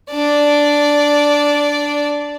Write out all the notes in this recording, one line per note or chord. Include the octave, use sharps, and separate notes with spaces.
D4 D5